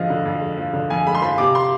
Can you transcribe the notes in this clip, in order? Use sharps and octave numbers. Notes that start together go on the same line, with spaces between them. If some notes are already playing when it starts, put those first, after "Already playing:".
Already playing: F2 D3 F3 G#3 D#5 F5
D3
F2
G#3
F3
D3
F2 G#5
G#3 B5
C6
F3 B5
C3 D6
C6